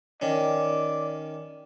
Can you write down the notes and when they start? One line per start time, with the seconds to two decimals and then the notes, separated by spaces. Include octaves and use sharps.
0.22 D#3 C#4 D5